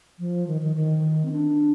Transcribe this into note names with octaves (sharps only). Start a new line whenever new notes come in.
F3
D#3
D#3
D#3
C4
D4